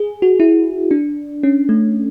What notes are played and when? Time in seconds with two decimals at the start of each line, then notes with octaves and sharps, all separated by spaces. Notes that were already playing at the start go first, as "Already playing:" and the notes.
Already playing: G#4
0.22 F#4
0.40 E4
0.91 D4
1.43 C#4
1.69 A3